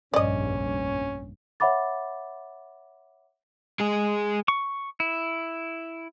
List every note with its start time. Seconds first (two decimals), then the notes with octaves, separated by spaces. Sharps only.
0.14 F1 A#1 G2 C#4 D5 D#5
1.60 C#5 E5 F#5 B5 D6 A6
3.80 G#3 G#4
4.48 C#6
5.00 E4